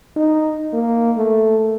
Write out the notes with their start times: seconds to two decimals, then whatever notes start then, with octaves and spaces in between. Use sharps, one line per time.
0.16 D#4
0.73 A#3
1.17 A3